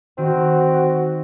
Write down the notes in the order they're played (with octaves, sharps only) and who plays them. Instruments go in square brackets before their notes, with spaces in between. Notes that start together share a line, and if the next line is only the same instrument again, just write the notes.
[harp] D#3 [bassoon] C4 [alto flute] F#4